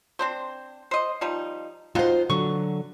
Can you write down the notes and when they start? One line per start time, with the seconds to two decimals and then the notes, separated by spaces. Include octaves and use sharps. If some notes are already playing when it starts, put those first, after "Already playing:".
0.19 C4 D4 C5
0.91 C5 D#5
1.21 F3 G3 D#4
1.95 B2 D#3 F4 C5
2.30 D3 F#3 C#6